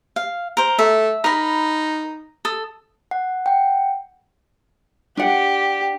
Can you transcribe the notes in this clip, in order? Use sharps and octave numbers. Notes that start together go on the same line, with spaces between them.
F5
A#4 C5
A3 E5
D#4 A#4 B5
A4 D#6
F#5
F#5 G5
D4 G4 F#5